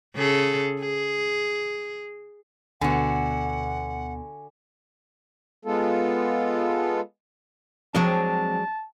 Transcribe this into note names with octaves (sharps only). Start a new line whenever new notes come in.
C#3 G#4 A4
G#4
D2 B2 D3 B3 F#4 F#5 G#5
G#3 B3 F4 A4
F3 F#3 G#3 C4 D4 G5 A5